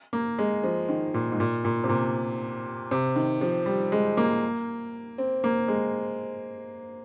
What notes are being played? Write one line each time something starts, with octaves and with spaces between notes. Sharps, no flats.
A#3
G#3
F3
D#3
A#2
G#2
A#2
A#2
C3
A#2
C3
D#3
F3
G3
G#3
A#3
C4
A#3
G#3